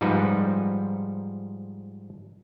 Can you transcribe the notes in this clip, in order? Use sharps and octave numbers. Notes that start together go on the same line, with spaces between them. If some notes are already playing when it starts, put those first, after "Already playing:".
G#2 F3 G3 D#4 B4